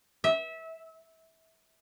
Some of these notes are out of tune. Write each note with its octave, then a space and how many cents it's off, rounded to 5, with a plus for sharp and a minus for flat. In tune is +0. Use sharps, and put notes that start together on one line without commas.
E5 -25